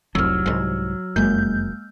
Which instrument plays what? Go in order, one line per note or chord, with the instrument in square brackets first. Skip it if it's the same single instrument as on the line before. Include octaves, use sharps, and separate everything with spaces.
[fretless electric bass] F1 C2 [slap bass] F#3 [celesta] E6 F6
[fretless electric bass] C2 G#2
[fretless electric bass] F1 F#2 [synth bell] G#3 A#3 G6